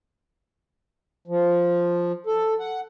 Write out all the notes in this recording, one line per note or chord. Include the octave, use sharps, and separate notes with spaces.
F3
A4
F#5